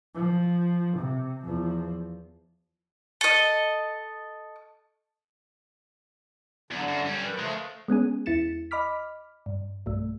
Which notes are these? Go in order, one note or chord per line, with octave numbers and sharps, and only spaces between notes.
F3
C3
E2 F3
A4 D#5
E2 D3 F#3
F#2
G3 C#4
D#3 B4
F3 G#3 A3 F4
G#3 B3 C#4 G#4
E2 E4 A6 C#7 E7
D#5 B5 D6 F6 B6
G2
B1 G2 A3